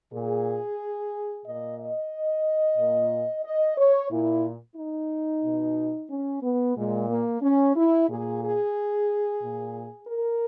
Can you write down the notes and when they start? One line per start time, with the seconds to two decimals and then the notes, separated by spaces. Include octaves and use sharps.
0.12 A#2 G#4
1.45 A#2 D#5
1.79 D#5
2.77 A#2
3.44 D#5
3.77 C#5
4.10 A#2 E4
4.76 D#4
5.44 B2
6.10 C#4
6.42 B3
6.75 A#2 G#3
7.09 A#3
7.42 C#4
7.75 E4
8.08 A#2 G#4
8.42 G#4
9.41 A#2
10.07 A#4